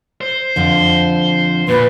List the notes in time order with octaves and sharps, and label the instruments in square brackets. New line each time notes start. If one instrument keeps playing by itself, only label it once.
[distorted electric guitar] C5
[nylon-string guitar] F2 D3 F3
[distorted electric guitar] A#2 [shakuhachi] B4